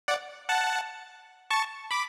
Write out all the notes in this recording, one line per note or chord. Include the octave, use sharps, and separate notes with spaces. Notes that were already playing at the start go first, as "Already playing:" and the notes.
D5 F#5
F#5 A5
A5 C#6
B5 D6